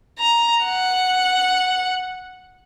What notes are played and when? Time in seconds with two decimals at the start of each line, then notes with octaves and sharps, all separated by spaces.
0.19 A#5
0.65 F#5